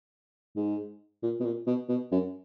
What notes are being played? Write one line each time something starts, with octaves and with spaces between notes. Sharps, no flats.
G#2
A#2
B2
A#2
B2
B2
F#2